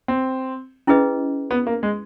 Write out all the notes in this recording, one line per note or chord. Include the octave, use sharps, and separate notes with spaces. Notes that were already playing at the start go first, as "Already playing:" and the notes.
C4
C#4 E4 G#4 B4 D#5
B3
A#3
G#3